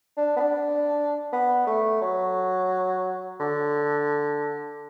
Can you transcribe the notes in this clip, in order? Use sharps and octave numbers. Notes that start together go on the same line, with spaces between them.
D4
B3
D4
B3
A3
F#3
D3